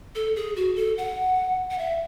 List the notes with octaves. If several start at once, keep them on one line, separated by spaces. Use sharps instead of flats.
A4
G#4
F#4
A4
F#5
F#5
E5